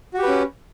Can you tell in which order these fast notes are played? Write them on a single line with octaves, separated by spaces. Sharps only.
F#4 G4 B4 C#4